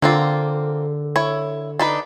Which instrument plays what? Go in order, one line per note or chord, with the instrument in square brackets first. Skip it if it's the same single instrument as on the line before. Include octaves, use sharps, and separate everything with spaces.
[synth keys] D3 [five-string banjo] A#3 C4 F4
[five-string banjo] E4 C#5
D4 D#4 B4